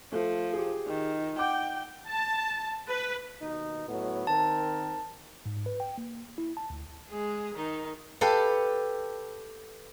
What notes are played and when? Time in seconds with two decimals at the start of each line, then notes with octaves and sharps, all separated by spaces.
0.12 F3 A3
0.53 G4 G#4
0.87 D#3
1.39 F#5 G5 D6 G6
2.08 A5
2.88 B4
3.40 D#2 B2 D#4
3.88 A2 F#3 B3
4.27 D#3 C4 A#4 A5
5.46 G#2
5.66 B4
5.80 G5
5.98 A#3
6.38 E4
6.57 A5
6.70 D2
7.09 G#3 G#4
7.55 D#3 D#4
8.21 G4 A4 B4 F5